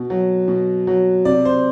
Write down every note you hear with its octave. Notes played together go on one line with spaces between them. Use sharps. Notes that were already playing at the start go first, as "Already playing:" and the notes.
Already playing: B2
F#3
B2
F#3
C3 D5
C5